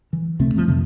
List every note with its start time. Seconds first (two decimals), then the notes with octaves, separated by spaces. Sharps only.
0.13 E3
0.39 C#2 C3 A3 C4
0.55 D1 C3 E3 F3
0.67 F2 C3 D#3